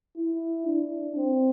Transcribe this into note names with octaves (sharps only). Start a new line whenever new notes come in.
E4
D4
C4